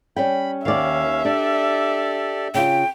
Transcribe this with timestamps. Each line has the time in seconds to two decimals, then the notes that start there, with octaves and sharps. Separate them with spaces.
0.16 G3 C#4 G5 B5
0.65 D#2 D#3 C#4 D5 E5 F5
1.25 D4 G4 A4 D5
2.54 C#3 F4 G5